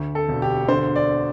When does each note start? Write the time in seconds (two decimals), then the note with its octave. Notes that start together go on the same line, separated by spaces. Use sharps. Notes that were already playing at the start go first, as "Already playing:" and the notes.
Already playing: D2
0.15 A4
0.29 E1
0.42 G4
0.69 D3 C5
0.96 D5